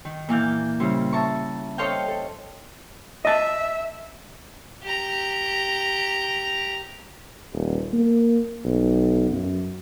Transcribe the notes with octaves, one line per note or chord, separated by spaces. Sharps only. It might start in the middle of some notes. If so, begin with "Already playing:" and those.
D#3
A#2 E3 F5 G6
C#3 G3 D#4 E4 C5
E5 A5 A#5 C#6
A4 C5 C#5 D#5 F5 G5
A4
D#5 E5 A5
G4 A#5
D#1
A#3
B1
F#2